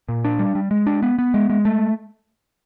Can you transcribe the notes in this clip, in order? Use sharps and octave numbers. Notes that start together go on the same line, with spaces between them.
A#2
D4
G3
G3
G#3
D4
B3
B3
G#3
G#3
A3